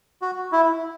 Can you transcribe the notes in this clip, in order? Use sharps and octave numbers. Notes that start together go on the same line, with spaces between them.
F#4
E4